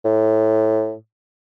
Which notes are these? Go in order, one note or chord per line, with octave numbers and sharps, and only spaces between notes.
A2